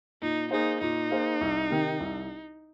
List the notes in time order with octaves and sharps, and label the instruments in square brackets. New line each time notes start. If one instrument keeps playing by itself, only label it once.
[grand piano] A#2 [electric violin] D#4
[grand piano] A#3 G#4 C5 [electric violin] D#4
[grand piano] A#2 [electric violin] D#4
[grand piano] A#3 G#4 C5
C2
C3 D#3
C2